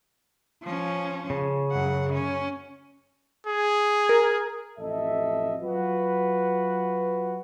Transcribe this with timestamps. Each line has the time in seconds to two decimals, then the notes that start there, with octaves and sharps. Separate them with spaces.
0.63 F3 C#4
1.30 C#3
1.72 F#2 F#5
2.13 C#4
3.47 G#4
4.09 A#4
4.78 A1 F2 A4 D#5 E5
5.62 F#3 F4 F#4 B4